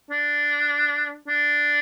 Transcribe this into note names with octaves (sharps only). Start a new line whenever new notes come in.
D4
D4